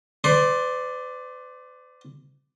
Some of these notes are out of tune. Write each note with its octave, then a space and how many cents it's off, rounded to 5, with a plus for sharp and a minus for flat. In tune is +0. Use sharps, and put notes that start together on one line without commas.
B4 +45 D5 +0 C6 +15